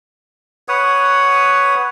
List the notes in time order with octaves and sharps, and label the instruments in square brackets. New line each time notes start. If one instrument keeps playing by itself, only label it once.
[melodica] B4 C#5 F#5 D#6